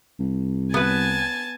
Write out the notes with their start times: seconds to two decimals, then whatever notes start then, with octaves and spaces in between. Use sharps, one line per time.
0.19 C2
0.74 B3 B4 G#5 A5 A6